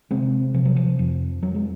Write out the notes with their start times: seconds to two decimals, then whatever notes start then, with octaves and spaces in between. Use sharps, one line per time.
0.11 C3 G#3 C4
0.54 C3 F3
0.65 F#3
0.76 F3
0.99 F2
1.43 F2 F#3
1.55 G#3